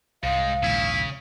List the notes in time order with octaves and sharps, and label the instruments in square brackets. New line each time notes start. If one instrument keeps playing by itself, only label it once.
[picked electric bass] C2 [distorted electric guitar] G#2 G#3 [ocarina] F5
[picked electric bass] A#1 D#2 G#2 [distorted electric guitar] C#3 [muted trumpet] E4